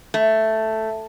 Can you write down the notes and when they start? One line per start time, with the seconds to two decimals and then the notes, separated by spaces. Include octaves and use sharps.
0.14 A3